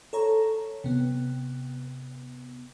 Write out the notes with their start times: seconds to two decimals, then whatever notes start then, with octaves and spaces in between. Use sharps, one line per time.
0.13 A4 C#5 A#5
0.84 C3 B3